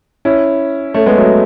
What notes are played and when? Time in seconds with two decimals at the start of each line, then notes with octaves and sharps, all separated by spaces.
0.25 C#4 E4
0.94 A3 C#4
1.06 G#3 B3
1.17 F#3 A3